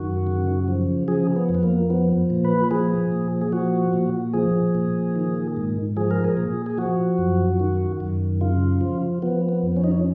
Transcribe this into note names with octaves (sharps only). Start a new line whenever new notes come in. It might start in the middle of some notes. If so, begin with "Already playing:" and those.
Already playing: F#2 D#3 F#4
C#3
F3
F3 G#4
B3
F2
B3
A#3
F3 B3
A#2
B4
F3 G#4
A#2
G#4
F3 F#4
A#2
F3 G#4
A#2
D#3
G#2
F3 G#4
A#4
G#4
A#2
G#4
F3 F#4
F#2
D#3
F#2
C#3 F4
F3
F3 B3
B3
F2
C#4
D#4
C#4